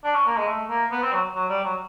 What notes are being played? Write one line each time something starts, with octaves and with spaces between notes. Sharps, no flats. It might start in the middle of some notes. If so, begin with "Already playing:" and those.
D4
C#4
A#3
G#3
A3
A#3
B3
C4
F#3
F#3
G3
F#3